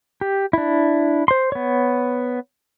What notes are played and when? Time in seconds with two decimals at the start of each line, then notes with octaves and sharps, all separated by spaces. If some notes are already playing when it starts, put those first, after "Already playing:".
0.21 G4
0.53 D4 E4
1.28 C5 C6
1.52 B3 C#5